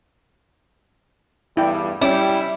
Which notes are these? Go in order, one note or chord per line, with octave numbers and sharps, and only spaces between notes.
E2 G2 G3 E4 G5
G3 C#4 E4 D6